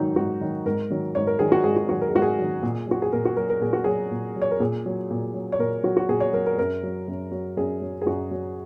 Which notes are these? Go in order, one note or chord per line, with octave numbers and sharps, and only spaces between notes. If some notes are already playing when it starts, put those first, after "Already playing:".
Already playing: G#2 D#3 F#3 D#4
G#2 F#4
D#3 F#3
G#2 A#4
D#3 F#3
G#2 C#5
A#4
D#3 F#3 G#4
F#4
G#2 G#4
F#4
D#3 F#3 F#4
A#4
G#4
G#2 F#4
G#4
D#3 F#3
A#2
F#3 F#4
G#4
A#2 A#4
F#4
F#3 A#4
A#4
A#2 G#4
F#4
F#3 G#4
A#2
F#3
C#5
A#4
A#2 G#4
F#3
A#2
F#3
C#5
A#2 A#4
F#3 F#4
F#4
A#2 G#4
C#5
F#3 A#4
A#4
F#2 A#4
F#3
F#2
F#3
F#2 G#4
F#3
G#4
F#2 F#4
F#3